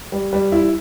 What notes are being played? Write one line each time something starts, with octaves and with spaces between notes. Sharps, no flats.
G3
G3
E4